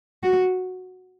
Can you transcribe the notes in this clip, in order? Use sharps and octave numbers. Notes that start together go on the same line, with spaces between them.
F#4